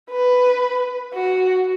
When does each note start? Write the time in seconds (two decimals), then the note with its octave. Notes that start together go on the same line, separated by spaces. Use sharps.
0.11 B4
1.14 F#4